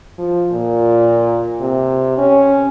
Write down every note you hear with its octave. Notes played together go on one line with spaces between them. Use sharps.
F3
A#2
C3
C#4